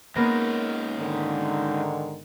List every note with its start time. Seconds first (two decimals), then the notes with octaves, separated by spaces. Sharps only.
0.16 G#3 A#3 B3 C#4 D#4 A#6
0.98 G#2 D3 D#3